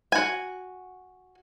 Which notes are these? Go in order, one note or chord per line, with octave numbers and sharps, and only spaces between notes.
F#4 G#5